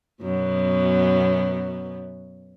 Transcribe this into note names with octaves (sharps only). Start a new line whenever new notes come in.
F#2 B2 B3